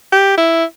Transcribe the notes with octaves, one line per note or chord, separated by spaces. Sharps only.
G4
E4